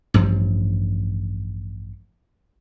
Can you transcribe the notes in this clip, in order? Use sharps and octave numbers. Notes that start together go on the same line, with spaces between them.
A1 G2 F3